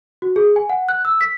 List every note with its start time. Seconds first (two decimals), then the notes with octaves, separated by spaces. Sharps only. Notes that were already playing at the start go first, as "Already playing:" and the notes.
0.22 F#4
0.36 G#4
0.56 G#5
0.70 F#5
0.89 F#6
1.05 E6
1.21 B6